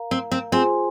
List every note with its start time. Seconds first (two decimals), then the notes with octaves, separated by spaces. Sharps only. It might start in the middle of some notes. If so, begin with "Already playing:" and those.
Already playing: A#4 F5 A#5
0.11 C4
0.31 C4
0.52 C4 F4 G#4 C5 G#5 C6